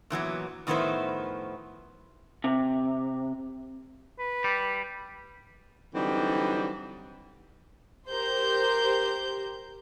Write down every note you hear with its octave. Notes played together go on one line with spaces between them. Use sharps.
A#2 E3 F#3 B3
A2 D#3 F3 B3 E4 C5
C3
B4
G3
D3 E3 F#3 G3 C4 D#4
G4 A#4 C5 G6